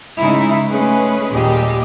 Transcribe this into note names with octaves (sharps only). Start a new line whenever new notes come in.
C#3 G#3 D#4 E4
G#3 A3 C#4 G#4 B4
D#2 A#2 G3 G4 G#4 D#5